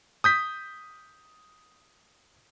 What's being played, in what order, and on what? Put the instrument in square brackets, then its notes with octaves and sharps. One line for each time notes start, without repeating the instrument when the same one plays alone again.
[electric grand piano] D#6 G6 B6